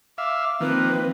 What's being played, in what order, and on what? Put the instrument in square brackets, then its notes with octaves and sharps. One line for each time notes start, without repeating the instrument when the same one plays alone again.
[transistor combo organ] E5 F5 [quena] D6
[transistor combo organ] D#3 F3 A#3 [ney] C4 [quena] B4